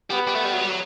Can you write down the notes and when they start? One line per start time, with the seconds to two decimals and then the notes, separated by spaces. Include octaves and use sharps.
0.10 G3 B3
0.27 G3
0.35 A3
0.45 G3
0.54 F#3
0.61 G3
0.70 F#3